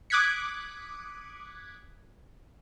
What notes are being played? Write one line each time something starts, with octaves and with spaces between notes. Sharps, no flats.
D6 D#6 F#6 G#6 B6 C#7